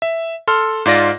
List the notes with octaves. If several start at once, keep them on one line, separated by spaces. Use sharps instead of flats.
E5
A4 C6 F6
G#2 F4 D5 A#6